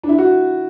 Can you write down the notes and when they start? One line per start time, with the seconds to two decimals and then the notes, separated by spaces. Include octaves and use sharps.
0.03 D4
0.09 E4
0.18 F#4